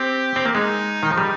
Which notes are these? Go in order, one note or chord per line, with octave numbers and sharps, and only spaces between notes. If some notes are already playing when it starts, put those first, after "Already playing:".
Already playing: C4 G4
C4
A#3
G#3 D#4
D#3
F3
G3 D#4